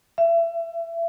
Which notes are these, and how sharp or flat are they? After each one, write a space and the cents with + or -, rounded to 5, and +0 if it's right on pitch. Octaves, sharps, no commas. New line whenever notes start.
E5 +30